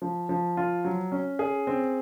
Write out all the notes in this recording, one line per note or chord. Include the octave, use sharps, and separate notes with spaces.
F3
F3
F4
F#3
C#4
G#4
C4